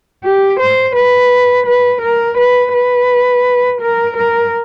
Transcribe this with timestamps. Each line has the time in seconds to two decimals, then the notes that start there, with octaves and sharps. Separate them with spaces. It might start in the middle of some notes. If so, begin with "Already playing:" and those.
0.24 G4
0.60 C5
0.96 B4
1.66 B4
2.02 A#4
2.38 B4
2.73 B4
3.81 A#4
4.17 A#4